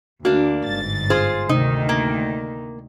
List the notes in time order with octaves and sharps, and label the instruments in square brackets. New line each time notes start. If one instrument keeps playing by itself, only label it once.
[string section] D2 [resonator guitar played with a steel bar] A#3 D4 [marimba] F#4
[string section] G1 G#2 A6
[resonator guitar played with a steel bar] F4 G#4 C5
[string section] D2 D#3 [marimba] C3 [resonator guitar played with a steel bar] D#4
[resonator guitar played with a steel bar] A#3